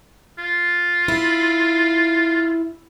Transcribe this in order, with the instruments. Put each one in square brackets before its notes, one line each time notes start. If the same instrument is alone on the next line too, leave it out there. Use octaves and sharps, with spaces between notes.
[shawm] F4
[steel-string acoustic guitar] E4